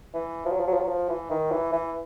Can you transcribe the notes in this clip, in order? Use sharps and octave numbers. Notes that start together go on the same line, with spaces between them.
E3
F3
F#3
F3
F#3
F3
F#3
F3
E3
D#3
E3
E3